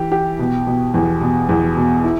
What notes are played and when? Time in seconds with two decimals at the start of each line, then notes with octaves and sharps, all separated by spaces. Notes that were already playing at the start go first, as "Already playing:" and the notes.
Already playing: E3 G4
0.12 G4
0.39 B2
0.67 B2
0.94 E2
1.21 B2
1.49 E2
1.77 B2
2.04 E4